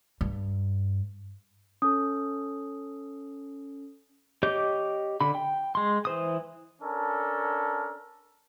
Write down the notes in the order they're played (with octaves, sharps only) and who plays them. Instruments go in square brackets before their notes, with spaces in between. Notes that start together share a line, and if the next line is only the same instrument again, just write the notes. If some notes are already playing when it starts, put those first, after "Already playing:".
[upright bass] G2
[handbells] C#4 A4 [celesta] D#6
[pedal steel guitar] G4 C#5 D#5 D6 G6
D3 B5
G5
G#3 C6
E3 C5 D#6
[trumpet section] C#4 D4 A4 A#4